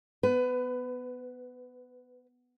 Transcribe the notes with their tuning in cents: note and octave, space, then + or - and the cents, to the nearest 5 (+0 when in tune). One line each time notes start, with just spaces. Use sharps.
B3 +5 B4 +25